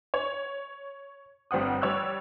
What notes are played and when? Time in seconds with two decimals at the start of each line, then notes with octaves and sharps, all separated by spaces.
0.14 C#5
1.51 G1 G3 C4 F#5 D#6
1.82 G3 C#5 E6 F#6